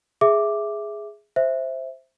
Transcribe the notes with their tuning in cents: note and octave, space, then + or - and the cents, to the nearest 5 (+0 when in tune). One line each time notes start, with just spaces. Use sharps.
G#4 +0 E5 +0 D6 +0
C5 +0 E5 +0